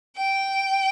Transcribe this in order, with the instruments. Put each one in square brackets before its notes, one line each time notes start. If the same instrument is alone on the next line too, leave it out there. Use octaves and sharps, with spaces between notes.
[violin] G5